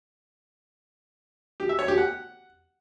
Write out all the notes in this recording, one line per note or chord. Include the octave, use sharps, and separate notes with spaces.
G4
E5
C#5
G4
F#5